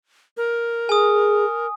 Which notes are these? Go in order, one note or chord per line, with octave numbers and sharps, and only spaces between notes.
A#4
G#4 G#5 D#6